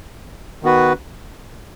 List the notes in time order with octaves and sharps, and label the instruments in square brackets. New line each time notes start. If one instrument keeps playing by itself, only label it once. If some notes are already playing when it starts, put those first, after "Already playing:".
[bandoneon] D#3 B3 F#4 B4